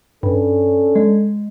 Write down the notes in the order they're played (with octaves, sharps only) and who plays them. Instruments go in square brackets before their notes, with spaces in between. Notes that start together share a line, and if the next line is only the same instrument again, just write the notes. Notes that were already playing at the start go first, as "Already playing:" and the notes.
[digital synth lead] G2 [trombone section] C#4 D4 A4
[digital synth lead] G#3